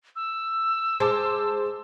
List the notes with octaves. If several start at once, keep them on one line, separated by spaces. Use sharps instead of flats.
E6
G#3 C5 A5 D6